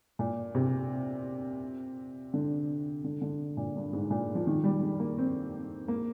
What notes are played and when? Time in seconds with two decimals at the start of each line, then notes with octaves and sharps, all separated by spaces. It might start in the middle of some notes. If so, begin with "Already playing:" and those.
0.19 A#2
0.55 C3
2.33 D3
3.04 D3
3.21 D3
3.57 A#2
3.76 G2
3.93 G#2
4.10 A#2
4.35 F3
4.47 D#3
4.64 G3
4.82 G3
5.00 A#3
5.18 C4
5.88 A#3